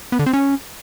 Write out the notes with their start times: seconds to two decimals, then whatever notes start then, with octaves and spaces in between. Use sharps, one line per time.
0.12 B3
0.19 D3
0.26 C4
0.33 C#4